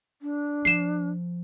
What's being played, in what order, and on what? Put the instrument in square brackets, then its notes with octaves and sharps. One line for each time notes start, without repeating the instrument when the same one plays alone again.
[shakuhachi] D4
[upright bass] F3 [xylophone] C7 E7